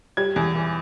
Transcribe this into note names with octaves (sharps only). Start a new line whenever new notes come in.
G3 G#6
E2
E3